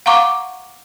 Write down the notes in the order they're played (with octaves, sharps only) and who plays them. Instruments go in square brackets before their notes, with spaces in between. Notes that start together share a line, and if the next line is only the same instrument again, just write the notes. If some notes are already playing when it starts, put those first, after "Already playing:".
[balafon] F5 F#5 A#5 C#6 D6